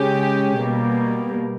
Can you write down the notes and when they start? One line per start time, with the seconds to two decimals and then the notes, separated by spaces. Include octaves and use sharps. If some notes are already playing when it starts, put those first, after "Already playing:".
Already playing: C#3 G#3 C#4 G4
0.57 B2 G3 A#3